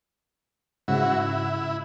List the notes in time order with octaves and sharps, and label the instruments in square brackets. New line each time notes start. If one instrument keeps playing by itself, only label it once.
[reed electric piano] G#2 C#3 [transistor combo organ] E4 F#4
[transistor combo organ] E4